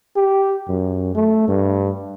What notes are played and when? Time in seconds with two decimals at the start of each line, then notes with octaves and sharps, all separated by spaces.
0.16 G4
0.68 F#2
1.15 A3
1.48 G2